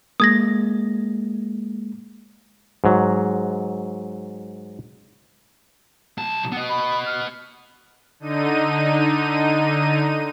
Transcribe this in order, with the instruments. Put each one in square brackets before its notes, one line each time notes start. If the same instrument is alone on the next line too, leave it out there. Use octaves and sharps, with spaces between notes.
[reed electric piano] G#3 A#3 [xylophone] D#6 G#6 A#6
[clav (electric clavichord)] G#2 F#3
[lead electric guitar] B1 A5
B3 D#5
[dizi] B5
F6
[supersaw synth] D3 D#4 D#7